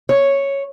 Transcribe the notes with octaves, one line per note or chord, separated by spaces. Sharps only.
C#5